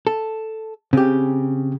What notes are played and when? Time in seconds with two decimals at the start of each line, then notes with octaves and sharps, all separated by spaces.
0.07 A4
0.93 C#3 C4 G4